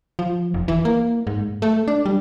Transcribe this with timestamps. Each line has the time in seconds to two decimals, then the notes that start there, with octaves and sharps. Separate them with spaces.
0.19 F3
0.54 F1
0.68 E3
0.85 A#3
1.27 G#2
1.62 A3
1.88 D4
2.06 G3